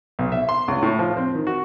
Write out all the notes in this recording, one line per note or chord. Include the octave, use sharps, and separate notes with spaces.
B1
E5
C6
C#2
A2
F3
C4
D#3
F#4